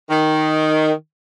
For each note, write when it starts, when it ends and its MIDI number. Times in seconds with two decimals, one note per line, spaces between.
0.10 0.92 51